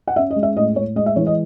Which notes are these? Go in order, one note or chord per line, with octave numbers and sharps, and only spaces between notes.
F#5
C#4 E5
D#5
G#3
E5
A2 D#5
A2 C#5
G#3 D#5
E5
E3 C#5
D#5